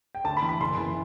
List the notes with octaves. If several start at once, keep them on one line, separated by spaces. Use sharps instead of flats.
G5
D2 A5
B5
E3
B5
F#1 C6
E3